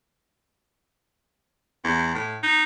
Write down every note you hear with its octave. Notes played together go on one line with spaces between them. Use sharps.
E2
A2
D#4